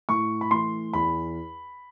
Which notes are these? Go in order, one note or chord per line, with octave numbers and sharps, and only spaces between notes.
A2 C#6
B5
E3 A3 C6
E2 B5